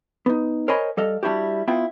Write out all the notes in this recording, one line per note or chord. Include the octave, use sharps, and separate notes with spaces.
B3 D#4
A#4 C5 C#5 D#5 G#5 B5
G3 A4 D#5 F5
G3 D4 E4 F#4 G4
B3 E4 F4 G5